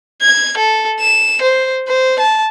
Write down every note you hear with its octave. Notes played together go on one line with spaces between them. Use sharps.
G#6
A4
E7
C5
C5
A5